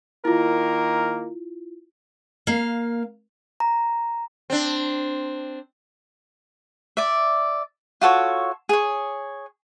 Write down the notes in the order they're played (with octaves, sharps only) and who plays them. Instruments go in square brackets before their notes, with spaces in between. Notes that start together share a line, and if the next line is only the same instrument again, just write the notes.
[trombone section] D#3 A#3 A#4 [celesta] E4 F4
[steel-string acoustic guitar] A#3 F5
[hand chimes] A#5
[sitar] C4 D4
[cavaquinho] D5 E5
F4 F#4 A4 C#5
G#4 C#5